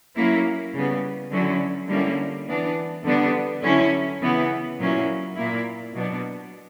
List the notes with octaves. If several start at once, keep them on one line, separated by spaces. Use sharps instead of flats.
F#3 A#3 C#4 E4
C#3 G3 B3
D3 F#3 C#4 E4
D3 G3 A#3 C#4 E4
E3 B3 D4
D3 G3 B3 D4
D3 F#3 C#4 E4
C#3 E3 B3 E4
A#2 F#3 A#3 C#4 E4
A#2 A#3 E4
B2 F#3 B3 D4